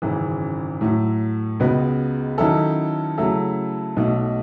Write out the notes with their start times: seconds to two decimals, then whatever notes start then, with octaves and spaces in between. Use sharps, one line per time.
0.02 G#1 F#2 C#3 E3
0.81 A2 F#3 A3
1.60 C#2 C#3 G#3 B3 F#4
2.38 D#3 F#3 C#4 E4 A4
3.18 C#3 F#3 A3 E4 A4
3.96 B1 B2 A3